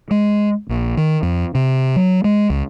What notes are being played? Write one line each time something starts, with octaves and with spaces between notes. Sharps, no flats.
G#3
A#1
D#3
F2
C3
F#3
G#3
C#2